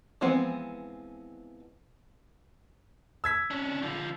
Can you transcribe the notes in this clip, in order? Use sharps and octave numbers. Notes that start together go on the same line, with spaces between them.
E3 F3 G#3 B3 C4
E6 G#6 B6
C#4 D4
D3 F3